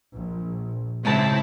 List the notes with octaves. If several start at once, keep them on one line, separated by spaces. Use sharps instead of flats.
A#1
G#2 C#3 C4 E4 A5